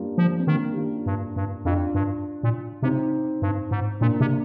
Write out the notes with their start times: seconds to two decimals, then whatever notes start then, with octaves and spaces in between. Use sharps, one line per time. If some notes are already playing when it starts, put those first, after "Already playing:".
Already playing: G3 A#3 D4 F4
0.18 F3
0.39 C4
0.47 D#3 A#3 D4
0.72 G4
0.76 D4 F4
1.06 G2
1.36 G2
1.65 F2 D4 F4
1.95 G2
2.43 A#2
2.82 C3 C4 D#4
3.42 G2
3.71 G#2
4.00 A#2 A#3 D4
4.20 C3